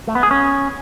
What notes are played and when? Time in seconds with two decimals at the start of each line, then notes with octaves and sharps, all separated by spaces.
0.07 A3
0.15 B3
0.23 G#4
0.31 C#4